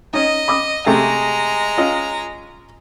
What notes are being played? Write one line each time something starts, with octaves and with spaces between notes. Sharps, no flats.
C#4 D#4 D#5
B5 D6 D#6
C3 G#3 A3 G#4 A#5
C#4 F4 D#5